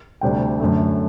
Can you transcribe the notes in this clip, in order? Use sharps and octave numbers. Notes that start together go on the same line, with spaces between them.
D2 C3 G3 D4 G5
F#2 D3 A3